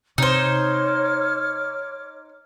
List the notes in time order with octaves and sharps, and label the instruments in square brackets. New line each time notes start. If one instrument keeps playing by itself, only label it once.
[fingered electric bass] C3 [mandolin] D#4 C5 [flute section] C#5 D6 F6